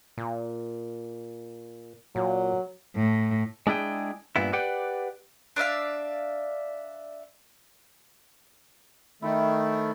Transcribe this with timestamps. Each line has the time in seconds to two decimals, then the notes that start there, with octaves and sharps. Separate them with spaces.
0.18 A#2
2.15 A#2 F#3
2.96 A2
3.67 G#3 D4 E4 G#4 G5
4.36 G2 A#2 B3 E4
4.53 G4 B4 D5 F#5 G5
5.56 D4 D5 E5 F5
9.22 D#3 A3 E4 A4 C5